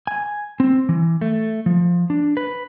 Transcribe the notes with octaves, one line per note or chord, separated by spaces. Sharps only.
G#5
C4
E3
A3
F3
D4
B4